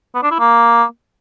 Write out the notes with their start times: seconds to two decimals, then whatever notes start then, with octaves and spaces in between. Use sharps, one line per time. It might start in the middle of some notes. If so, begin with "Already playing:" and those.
0.15 B3
0.23 D4
0.31 E4
0.40 A#3